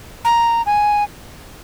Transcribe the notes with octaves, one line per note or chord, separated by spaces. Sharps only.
A#5
G#5